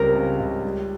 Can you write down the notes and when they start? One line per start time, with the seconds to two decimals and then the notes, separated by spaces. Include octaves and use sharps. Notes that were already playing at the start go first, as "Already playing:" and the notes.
Already playing: C#2 C#3 G3 C4 A#4
0.15 C#3
0.40 C#2
0.64 G3